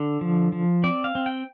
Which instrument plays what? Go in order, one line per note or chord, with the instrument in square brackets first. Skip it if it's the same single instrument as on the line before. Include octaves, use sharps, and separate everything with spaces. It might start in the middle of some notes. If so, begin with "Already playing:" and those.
Already playing: [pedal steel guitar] D3
F3
F3
C4 D5
F5
C4
G5